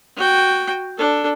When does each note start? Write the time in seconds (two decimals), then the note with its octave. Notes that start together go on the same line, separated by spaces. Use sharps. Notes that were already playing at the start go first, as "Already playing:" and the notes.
0.16 F#4 G5
0.98 D4 A4